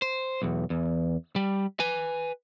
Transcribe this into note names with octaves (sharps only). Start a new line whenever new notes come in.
C5
B1 E2
E2
G3
B4 G#5